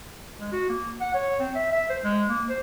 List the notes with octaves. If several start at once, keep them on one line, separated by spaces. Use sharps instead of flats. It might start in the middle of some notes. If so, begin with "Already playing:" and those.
G#3
F#4
A#3
F#5
C#5
C4
E5
E5
C5
G#3
A#3
C5